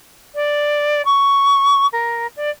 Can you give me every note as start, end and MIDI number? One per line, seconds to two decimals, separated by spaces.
0.35 1.01 74
1.05 1.86 85
1.92 2.26 70
2.36 2.50 74